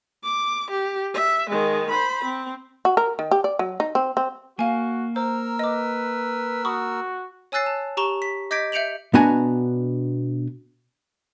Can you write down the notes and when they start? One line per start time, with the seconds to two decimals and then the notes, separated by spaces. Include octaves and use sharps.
0.23 D6
0.70 G4
1.14 E5
1.49 D#3 G#3
1.89 C5 B5
2.24 C4
2.85 F#4
2.97 A#4
3.19 D#3
3.31 G4
3.44 D5
3.59 F#3
3.80 D#4
3.95 C4
4.17 C4
4.59 A#3 F#4 F5 G#5
5.16 A#4 C5 A#5 E6
5.59 B4 D#5 D6
6.65 F#4 B5 C#6 D#6
7.52 C#5 G#5 E6 F#6 A6 C7
7.66 A5
7.97 G4 A#5 C#6 E7 G7
8.22 B6
8.51 D#5 D6 G6 G#6 B6 D7
8.72 E5 G6 C#7 D7 F7 F#7
9.14 B2 B3 D4 F#4 G#5 A#5